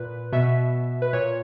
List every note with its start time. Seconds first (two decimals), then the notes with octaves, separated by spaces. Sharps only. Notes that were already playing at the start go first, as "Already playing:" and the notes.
Already playing: A#2 B4
0.33 B2 E5
1.02 B4
1.13 A#2 C#5